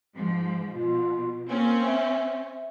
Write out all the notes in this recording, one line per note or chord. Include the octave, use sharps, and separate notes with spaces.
G#2 F3
B2 F4
A#3 C4 C#4
E5